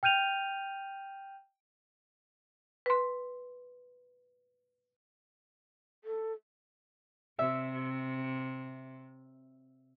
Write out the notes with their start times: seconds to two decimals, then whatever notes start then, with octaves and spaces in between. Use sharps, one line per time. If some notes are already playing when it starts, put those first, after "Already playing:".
0.03 G5 F6 G6 D#7 F7
2.86 B4 C6
6.04 A4
7.39 C3 E5